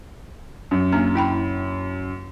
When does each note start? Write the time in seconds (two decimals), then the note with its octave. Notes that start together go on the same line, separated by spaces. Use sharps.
0.71 F#2
0.92 A#3 D4 A#5
1.15 E4 G5 B5